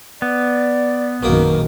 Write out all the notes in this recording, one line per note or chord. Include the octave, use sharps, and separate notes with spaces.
B3 D5
A#1 F#2 B2 D#3 A#3